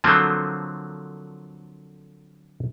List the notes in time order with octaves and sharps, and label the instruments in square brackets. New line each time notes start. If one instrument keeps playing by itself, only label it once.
[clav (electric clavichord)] D3 F3 F#3 A3 A#3 C4